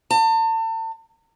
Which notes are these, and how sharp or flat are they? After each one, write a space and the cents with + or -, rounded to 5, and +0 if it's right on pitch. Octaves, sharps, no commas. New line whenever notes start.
A5 +40